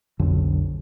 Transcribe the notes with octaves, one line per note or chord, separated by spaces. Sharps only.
F1 B1 F2 D3